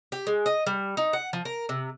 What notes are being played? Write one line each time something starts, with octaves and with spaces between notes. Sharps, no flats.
G4
G#3
D#5
G3
D#4
F#5
F3
A#4
C3